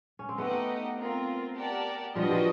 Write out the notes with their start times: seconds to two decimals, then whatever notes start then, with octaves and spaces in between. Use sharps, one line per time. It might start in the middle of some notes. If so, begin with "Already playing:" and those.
0.19 C#4
0.29 C4
0.38 A3 B3 D#4 G4 B4 D#5 F#5
0.98 C4 F4 A#4
1.56 G4 A#4 D5 F#5 A5
2.15 F3 G3 D4 F#4 B4 D#5
2.31 F3